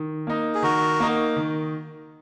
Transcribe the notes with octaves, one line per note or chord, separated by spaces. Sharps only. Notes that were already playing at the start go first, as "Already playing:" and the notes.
Already playing: D#3
A#3 D#4
G#4
D#3 F#4 A#4
A#3 D#4
D#3